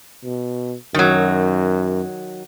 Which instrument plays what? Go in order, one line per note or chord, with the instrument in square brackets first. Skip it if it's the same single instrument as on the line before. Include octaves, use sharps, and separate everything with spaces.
[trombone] B2
[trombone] F#2 [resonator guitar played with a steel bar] D#3 F#3